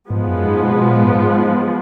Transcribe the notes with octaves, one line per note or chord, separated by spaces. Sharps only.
G#2 F3 G#3 B3
F#2
G#2
B2
B2
A#2
G#2
G#2